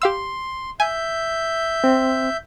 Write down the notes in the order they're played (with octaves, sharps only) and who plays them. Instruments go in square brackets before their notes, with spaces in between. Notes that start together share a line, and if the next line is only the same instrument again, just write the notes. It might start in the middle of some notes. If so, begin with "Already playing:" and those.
[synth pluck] G4 F5 E6 [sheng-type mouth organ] C6
[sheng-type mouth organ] E5 G6 [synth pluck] G#5
[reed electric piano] C4